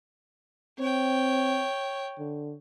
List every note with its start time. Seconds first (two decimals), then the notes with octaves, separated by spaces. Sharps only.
0.79 C4 C#5 G5
2.19 D3